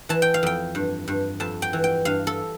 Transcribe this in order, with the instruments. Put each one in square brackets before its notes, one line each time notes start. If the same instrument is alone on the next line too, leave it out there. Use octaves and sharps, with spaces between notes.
[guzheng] E3 A5
G5
F5
F2 G5
G2
G2
F2 A5
G5
E3
G5
G2 F5
A4